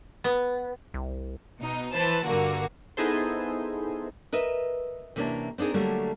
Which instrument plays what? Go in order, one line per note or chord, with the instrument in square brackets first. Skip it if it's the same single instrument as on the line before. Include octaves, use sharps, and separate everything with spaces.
[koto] B3
[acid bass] C2
[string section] B2 D#4
E3 B4 C5 A5
G2 D3 A#3 F#4
[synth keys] B3 D#4 E4 G#4 A4 C5
[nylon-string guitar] A#4 B4 D#5 E5
C3 E3 A#3 C#4 D4
C4 D4 D#4 G#4 A#4
D3 F#3 G3 A3 A#3 F#4